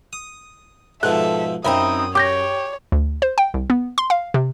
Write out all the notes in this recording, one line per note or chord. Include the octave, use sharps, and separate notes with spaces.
D#6
G#2 B2 F3 A4 E5 F#6
F#2 C4 D#4 E4 D#6
G4 C#5 D6 G6 A#6
D2
C5
G5
C2
B3
C6
F5
C3